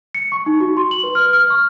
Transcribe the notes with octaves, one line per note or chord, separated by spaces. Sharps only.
C#7
C#6
D#4
F#4
C6
F#7
B4
F6
F6
C#6